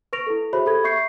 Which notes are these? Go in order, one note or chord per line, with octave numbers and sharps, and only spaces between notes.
B4 C#6 A#6 D7 F7
E4 A4
F#4 G#4 C5 C#5 E5 B5
G4 A4 B5 G#6
E5 C#6 G6 C7 C#7